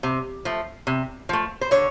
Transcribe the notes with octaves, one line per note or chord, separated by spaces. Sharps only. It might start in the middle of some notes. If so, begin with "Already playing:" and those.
C3
F3 A3
C3
F3 A3
C5
D3 C#5